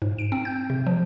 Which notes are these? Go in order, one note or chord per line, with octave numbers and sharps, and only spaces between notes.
G#2
D7
C4
G6
C3
F3